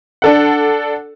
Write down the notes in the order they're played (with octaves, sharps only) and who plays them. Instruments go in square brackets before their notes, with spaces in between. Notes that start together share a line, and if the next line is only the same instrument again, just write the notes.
[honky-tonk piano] D4 A4 F#5